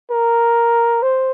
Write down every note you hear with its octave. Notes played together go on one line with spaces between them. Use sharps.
A#4
C5